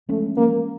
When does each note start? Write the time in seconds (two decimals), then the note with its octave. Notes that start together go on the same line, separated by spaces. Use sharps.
0.09 F3 G#3 A3 C#4
0.37 F3 G#3 A#3 C#4